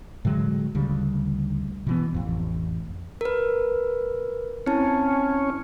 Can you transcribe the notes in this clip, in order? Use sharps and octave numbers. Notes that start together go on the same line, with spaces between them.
A2 D3 F#3 G#3
D2 C#3 G3
B2 E3 B3
A1 F2
A#4 B4
C4 C#4 E4 A5